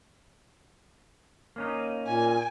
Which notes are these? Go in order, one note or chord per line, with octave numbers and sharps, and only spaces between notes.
A#3 C#4 D#4
A#2 G#5